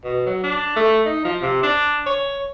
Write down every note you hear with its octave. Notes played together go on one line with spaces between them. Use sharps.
B2
F#3
D4
A3
D#4
F3
C3
D4
C#5